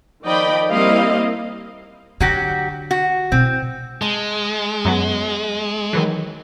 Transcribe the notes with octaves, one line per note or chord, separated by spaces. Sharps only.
D#3 F3 D5 D#5 G5 B5
G3 A#3 C4 E4 D#5 F5
D3 F#3 F#4 G4
F#4
B2 C4 E4
G#3 A5
F#2 F#3 B3
D#3 E3 F#3